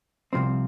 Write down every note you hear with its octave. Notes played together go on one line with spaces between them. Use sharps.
C2 C3 F3 C4